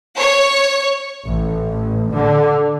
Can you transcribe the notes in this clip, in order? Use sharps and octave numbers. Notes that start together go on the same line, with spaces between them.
C#5
A1
D3